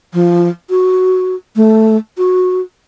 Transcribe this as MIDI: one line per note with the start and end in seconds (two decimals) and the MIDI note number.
0.13 0.48 53
0.70 1.35 66
1.56 1.96 57
2.18 2.61 66